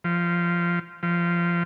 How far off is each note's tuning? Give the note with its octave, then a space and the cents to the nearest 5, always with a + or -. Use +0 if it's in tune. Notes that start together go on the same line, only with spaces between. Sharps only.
F3 -15
F3 -20